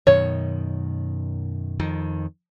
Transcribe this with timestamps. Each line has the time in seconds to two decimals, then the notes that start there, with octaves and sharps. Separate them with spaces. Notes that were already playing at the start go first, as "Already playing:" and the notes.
0.07 F#2 B2 D#3 C#5
1.80 F2 D#3